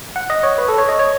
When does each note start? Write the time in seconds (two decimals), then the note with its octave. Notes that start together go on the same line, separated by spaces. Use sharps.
0.16 F#5
0.30 D#5
0.43 C#5
0.58 B4
0.68 A4
0.78 C#5
0.89 D#5
0.99 C#5